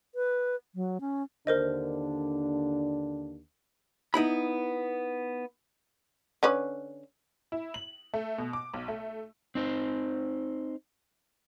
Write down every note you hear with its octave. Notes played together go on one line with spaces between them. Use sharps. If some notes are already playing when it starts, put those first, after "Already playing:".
B4
F#3
C#4
D#2 D3 D4 A#4 C5 D#5
B3 D#4 E4 B5
D3 C#4 B4
E4
F#7
A3
B2
D6
B1
A3
C4 D#4 C5